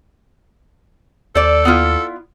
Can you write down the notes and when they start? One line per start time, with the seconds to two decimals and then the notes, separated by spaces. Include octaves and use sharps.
1.35 D#2 A4 C5 D5
1.65 B3 E4 F4